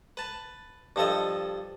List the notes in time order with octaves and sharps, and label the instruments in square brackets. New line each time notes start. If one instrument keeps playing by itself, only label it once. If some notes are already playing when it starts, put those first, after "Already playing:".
[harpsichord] B4 A5
G2 F3 A4 D#5